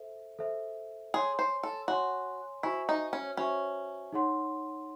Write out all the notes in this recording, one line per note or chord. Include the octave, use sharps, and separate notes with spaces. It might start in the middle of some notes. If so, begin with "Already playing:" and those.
Already playing: A4 C5 E5
A4 C5 E5
G#4 C#5 G#5 C6
C5
A4
F#4 C#5 G#5 C6
E4 F#4 C5 E5 G#5 C#6
D#4
C#4
C#4 F#4 C5 E5 G#5 C#6
D#4 G#4 C#5 F#5 C6